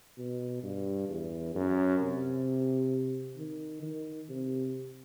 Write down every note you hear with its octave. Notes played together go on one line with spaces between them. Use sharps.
B2
G2
E2
F#2
C3
D#3
D#3
C3